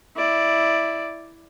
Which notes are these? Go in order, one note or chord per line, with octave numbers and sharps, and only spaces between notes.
E4 D5